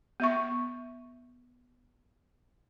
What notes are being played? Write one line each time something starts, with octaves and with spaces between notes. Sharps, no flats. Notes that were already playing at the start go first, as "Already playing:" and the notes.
B3 E5 C#6